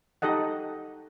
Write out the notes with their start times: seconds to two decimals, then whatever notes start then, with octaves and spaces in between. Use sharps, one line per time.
0.22 D#4 G4 A4 D#5 F#5